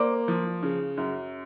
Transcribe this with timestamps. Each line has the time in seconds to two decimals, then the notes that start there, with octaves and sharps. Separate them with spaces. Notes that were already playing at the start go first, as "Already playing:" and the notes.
Already playing: A#3 C5 D5
0.28 F3
0.63 C#3
0.97 F#2